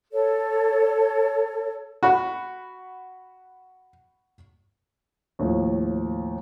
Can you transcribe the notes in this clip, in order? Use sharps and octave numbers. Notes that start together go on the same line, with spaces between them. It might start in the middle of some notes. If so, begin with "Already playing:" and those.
A4 C#5
F#4 F#5 B5 C#6
D#2 A2 F3